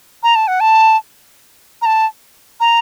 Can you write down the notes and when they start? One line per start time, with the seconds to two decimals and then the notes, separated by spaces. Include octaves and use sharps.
0.23 A#5
0.35 A5
0.48 F#5
0.60 A5
1.82 A#5
1.86 A5
2.60 A#5